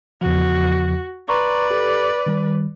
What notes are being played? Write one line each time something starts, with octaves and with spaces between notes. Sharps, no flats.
E2 C#3 F3 F#4
B4 D5 A#5 C6 C#6
G4 A4
D#3 G3